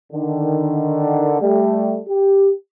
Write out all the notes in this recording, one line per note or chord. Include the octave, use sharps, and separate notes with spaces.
D3 D#3
G3 A3
G4